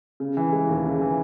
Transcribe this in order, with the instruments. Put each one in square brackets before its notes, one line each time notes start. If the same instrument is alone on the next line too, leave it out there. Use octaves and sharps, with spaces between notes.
[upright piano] C#3
E3
G#3
D#2
C#3
E3